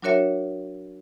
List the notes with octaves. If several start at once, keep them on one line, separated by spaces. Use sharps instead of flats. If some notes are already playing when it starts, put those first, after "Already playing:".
F#3 D4 F#4 A#4 C#5 E5